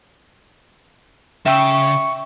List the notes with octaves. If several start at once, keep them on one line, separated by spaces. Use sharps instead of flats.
C#3 E5 G5 C#6 E6